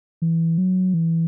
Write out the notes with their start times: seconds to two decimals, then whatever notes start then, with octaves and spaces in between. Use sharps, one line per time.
0.22 E3
0.58 F#3
0.94 E3